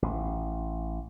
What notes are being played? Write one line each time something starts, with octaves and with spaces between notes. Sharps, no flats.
A1